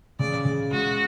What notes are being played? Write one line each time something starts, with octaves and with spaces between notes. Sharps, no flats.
C#3 D5
C#3
G#3 F#4